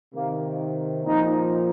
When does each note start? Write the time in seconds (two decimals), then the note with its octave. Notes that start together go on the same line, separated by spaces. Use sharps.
0.13 C3 D#3 A#3
1.05 A#2 F3 D#4